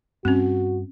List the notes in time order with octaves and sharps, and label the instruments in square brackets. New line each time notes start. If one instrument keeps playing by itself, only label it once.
[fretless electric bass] G2 [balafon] C4 C#4 [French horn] F#4